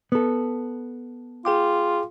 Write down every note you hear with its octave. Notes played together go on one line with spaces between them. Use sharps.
B3 A4
F4 G#4 G5 D6